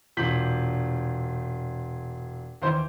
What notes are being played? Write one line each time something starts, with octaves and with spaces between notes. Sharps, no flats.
E1 A#2 G6 B6 F#7
D#2 E3 C5 C6 G6